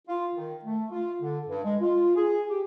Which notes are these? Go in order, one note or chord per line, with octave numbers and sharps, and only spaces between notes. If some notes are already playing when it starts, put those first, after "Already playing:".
F4
D#3
A3
F4
D3
G2
G#3
F4
G#4
G4